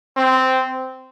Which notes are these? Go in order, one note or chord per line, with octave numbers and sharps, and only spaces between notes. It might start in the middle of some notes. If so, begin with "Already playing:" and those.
C4